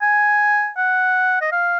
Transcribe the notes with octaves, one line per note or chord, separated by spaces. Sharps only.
G#5
F#5
D#5
F5